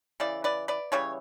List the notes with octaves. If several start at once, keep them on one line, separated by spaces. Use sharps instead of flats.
C#3 E3 D5
B4 D5
B4 D5
C#3 E3 G3 C#5